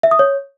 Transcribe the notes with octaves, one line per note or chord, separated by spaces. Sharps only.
E5
D#6
C#5